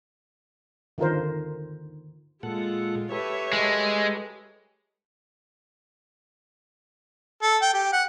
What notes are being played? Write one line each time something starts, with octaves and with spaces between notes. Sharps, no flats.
D3 D#3 F4 A#4 C5
A#2 G#3 F4 A4 F#5
G4 A4 B4 C#5 E5
G#3
A4
G5
G4
F#5